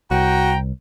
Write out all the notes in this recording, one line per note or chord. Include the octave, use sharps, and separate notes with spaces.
C2 F#4 G5 A#5